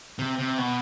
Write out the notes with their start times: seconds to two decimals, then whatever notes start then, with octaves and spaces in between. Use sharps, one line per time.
0.19 C3
0.38 C3
0.58 B2